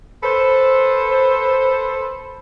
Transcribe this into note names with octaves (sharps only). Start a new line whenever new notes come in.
A4 B4 C5